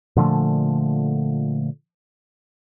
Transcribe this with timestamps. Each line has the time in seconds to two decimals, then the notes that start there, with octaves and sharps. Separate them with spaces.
0.16 A#2 D3 F3 A3